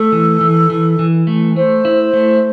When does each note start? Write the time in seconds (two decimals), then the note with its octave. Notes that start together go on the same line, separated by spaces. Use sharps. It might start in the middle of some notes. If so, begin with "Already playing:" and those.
Already playing: A3 A4
0.12 E3
0.41 E3
0.70 E3
0.99 E3
1.27 A3
1.56 A3 C5
1.85 E4
2.13 A3